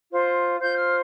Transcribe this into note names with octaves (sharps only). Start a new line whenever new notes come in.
F4 C5
F4 C5 G6
F6